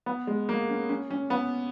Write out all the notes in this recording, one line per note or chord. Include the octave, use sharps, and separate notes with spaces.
B3
G#3
A#3
C#4
C#4
C#4
B3